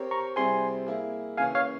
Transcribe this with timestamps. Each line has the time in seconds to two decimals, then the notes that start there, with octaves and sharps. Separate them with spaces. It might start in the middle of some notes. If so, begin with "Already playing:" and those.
Already playing: C4 G4 A#4 C#5
0.11 A#5 C#6
0.36 C3 G3 C4 E4 G#4 G#5 C6
0.87 A#3 E4 G#4
1.37 C#3 E3 A#3 C#4 F5 G#5
1.55 C#5 F5